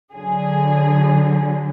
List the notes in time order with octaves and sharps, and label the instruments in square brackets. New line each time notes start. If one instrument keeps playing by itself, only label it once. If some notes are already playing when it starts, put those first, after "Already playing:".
[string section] D3 F#3 G#4